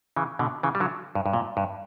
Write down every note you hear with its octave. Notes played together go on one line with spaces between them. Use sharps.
C#3 E3
B2 D3
C#3 E3
G3
D3 F#3
G2
G2
A#2
G2